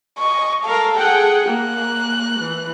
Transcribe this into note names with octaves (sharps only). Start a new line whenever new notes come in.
D#5 C#6
A4 A#4 F5
G#4 F#5 G5
A#3 F#6
E3